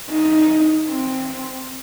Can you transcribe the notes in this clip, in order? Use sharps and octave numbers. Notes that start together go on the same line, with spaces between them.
D#4
C4